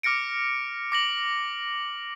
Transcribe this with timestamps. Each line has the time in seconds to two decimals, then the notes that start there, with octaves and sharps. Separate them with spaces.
0.03 D6 F6 A#6 C#7 D7
0.92 D6 A#6 F#7